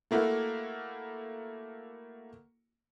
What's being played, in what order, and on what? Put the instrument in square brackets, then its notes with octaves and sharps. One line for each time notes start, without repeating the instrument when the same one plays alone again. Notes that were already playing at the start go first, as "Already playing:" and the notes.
[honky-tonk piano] A3 A#3 E4 F#4